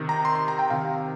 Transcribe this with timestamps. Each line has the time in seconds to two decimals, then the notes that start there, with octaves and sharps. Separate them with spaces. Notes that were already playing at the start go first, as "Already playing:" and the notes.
Already playing: C3 D#3
0.09 A#5
0.25 C6
0.35 C6
0.48 A#5
0.59 G5
0.70 C3 D#3 F5